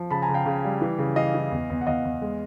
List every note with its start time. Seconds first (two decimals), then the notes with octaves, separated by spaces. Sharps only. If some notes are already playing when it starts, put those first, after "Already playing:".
Already playing: F3
0.10 C#3 A5 B5
0.22 G#5 A#5
0.29 C#3
0.34 F5 G5
0.46 C#3
0.64 G3
0.81 E3
0.98 C#3
1.16 E3 D#5 F5
1.34 E3
1.51 E2
1.70 E2
1.81 F#5
1.87 E2 D#5 F5
2.05 E2
2.22 G#3